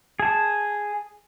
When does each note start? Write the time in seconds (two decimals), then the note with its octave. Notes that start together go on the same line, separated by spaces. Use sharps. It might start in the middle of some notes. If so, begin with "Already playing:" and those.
0.20 G#4 A5